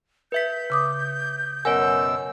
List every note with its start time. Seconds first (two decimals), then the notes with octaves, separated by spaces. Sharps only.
0.32 B4 E5 G6 B6
0.70 C#3 D6 D#6
1.65 F#2 B2 A#4 C#5 F#5 G#5 E6